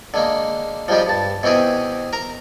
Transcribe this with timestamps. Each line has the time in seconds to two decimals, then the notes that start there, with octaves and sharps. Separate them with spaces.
0.14 D3 G#3 A#3
0.88 F3 G3 G#3 D#4 G4
1.07 G2 A5
1.43 B2 E3 C4 G4 G#4
2.13 A#4 A#5